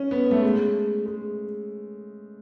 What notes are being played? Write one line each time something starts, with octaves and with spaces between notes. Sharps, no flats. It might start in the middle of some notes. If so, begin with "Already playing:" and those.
Already playing: C#4
B3
A3
G#3
G#3